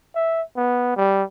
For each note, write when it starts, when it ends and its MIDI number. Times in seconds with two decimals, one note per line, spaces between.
0.15 0.42 76
0.57 0.95 59
0.97 1.23 55